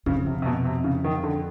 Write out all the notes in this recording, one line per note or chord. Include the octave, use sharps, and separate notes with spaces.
F2 C#3
C3
C3
B2
C3
C#3
D#3
D3